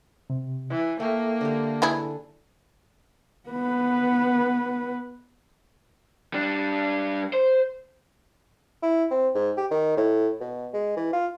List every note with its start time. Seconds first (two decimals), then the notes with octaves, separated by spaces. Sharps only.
0.30 C3
0.70 E3
1.00 A3 A#3 A4 E5 G5
1.41 D3 G4
1.82 E3 E4 G#4
3.50 B3 B4
6.33 G3 D4
7.34 C5
8.83 E4
9.10 C4
9.35 G#2
9.57 G4
9.71 D#3
9.97 A2
10.41 B2
10.74 G#3
10.97 E3
11.13 F4